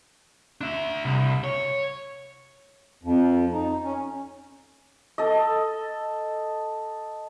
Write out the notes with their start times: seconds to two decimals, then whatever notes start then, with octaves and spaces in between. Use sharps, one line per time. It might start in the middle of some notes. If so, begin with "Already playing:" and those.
0.61 D4 E5
1.05 C2
1.44 C#5
3.03 F2
3.53 D#4
3.84 C#4
5.18 A4 D#5